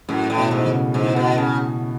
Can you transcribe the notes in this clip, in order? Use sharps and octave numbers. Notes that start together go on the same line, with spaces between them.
F#2 A2
A2
B2
G#2
C#3
G#2 E3
B2
C#3